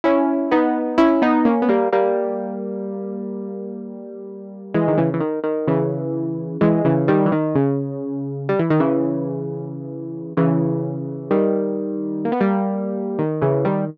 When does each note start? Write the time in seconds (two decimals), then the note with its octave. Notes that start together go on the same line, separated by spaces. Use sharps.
0.04 C#4 E4
0.51 B3 D#4
0.98 C#4 E4
1.22 B3 D#4
1.45 A#3 C#4
1.62 B3
1.68 G3 A#3
1.93 G3 A#3
4.74 E3 G#3
4.88 D#3
4.97 C#3 E3
5.14 E3
5.20 D#3
5.44 D#3
5.67 C#3 E3
6.61 E3 G#3
6.85 C#3 E3
7.08 D#3 G3
7.26 E3
7.32 D#3
7.55 C#3
8.49 G3
8.59 E3
8.70 D#3
8.80 C#3 E3
10.37 C#3 E3
11.31 D#3 G3
12.25 A#3
12.32 B3
12.40 G3 A#3
13.19 D#3
13.42 C#3 E3
13.65 D#3 G3